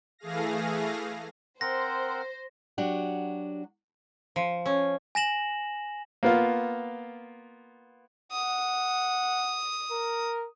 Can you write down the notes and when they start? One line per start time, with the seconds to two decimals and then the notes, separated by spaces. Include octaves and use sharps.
0.19 E3 A3 G#4 F5 A#6
1.61 C4 A#4 C5 F#5 C6 A#6
2.78 F#3 D4 F#4 G4
4.36 F3
4.65 C#4
5.15 G#5 A#6 E7 F#7
6.23 A#3 B3 F4
8.32 F#5 D#6
9.91 A#4